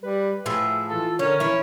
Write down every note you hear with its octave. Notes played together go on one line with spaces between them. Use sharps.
G3 B4
A2 F3 G#4 E5
E3 F4 A4
D3 C#4 A#4 C#5
E3 E4 C#5